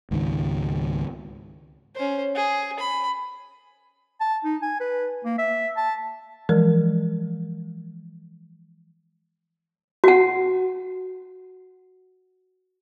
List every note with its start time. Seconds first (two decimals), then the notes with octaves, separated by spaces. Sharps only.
0.11 C#2 G#2 D#3
1.95 C#4 C5
2.35 G#4
2.79 B5
4.21 A5
4.44 D#4
4.62 G#5
4.80 B4
5.25 A#3
5.38 E5
5.76 A5
6.49 E3 F3 G#3 A#4
10.04 F#4 F#5